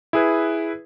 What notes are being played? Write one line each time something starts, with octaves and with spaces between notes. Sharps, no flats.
E4 G#4 B4